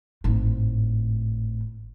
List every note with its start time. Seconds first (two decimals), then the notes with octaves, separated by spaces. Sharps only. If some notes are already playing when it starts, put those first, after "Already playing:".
0.24 G#1 A2